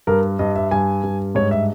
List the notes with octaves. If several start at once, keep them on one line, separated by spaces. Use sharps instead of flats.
G2 A#4
G2 D#5
E5
G2 G#5
G2
G#2 C#5
E5